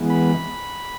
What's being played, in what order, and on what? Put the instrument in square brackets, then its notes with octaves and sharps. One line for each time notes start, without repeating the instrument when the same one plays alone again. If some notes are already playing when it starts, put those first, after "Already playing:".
Already playing: [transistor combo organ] E3 G#3 B3
B5